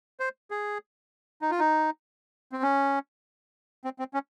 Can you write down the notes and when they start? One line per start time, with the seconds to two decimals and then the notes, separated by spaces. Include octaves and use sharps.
0.20 C5
0.51 G#4
1.42 D#4
1.51 F4
1.59 D#4
2.52 C4
2.63 C#4
3.84 C4
3.99 C4
4.14 C#4